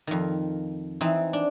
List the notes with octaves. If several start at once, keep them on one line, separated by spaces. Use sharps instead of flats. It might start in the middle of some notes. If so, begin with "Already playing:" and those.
F2 D#3
E3 C4 D#4
D4